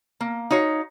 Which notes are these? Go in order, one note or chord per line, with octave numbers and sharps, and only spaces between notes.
A#3
D#4 F#4 C#5 F5